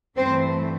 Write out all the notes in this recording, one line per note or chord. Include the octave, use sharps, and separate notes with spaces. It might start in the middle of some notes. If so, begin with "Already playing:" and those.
G2 E3 A3 C4 C5